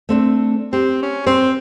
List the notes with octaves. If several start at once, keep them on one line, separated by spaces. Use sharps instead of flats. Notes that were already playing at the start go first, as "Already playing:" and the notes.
A3 C4 D4
C4 G4
C#4
C4 C5